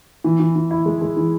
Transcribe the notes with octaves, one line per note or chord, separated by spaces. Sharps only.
E3
E3
E3
E4
G#3
G#3
E3